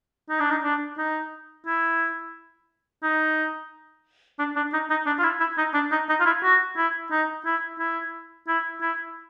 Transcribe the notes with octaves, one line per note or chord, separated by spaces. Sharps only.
D#4
D4
D#4
D4
D#4
E4
D#4
D4
D4
D#4
D#4
D4
F4
E4
E4
D#4
D4
D#4
D#4
F4
E4
F#4
E4
D#4
E4
E4
E4
E4